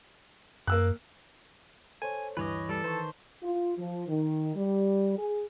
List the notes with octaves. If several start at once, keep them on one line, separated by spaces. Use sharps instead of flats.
F#2 A#3 E6 F#6
A4 C5 C#5 G#5
D2 G2 E3 B4 C#5 D#5 D6
G3 A4
D#3 B4 C5 A5 C#6
F4
F3
D#3
G3
G#4